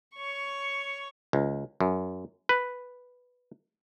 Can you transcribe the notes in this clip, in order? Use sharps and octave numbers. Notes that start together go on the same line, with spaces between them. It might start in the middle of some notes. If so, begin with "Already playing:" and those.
C#5 C#6
C#2
F#2
B4